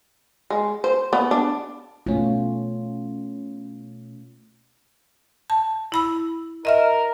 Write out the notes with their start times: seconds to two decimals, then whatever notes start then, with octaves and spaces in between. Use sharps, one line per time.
0.50 G#3
0.84 C5
1.13 B3
1.31 D4
2.07 B2 A3 C#4 F4
5.50 A5
5.92 E4 B5 E6
6.65 A#4 D#5 E5 F6